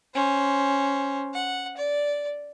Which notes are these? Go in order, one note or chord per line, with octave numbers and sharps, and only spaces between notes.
C#4 C5
F#5
D5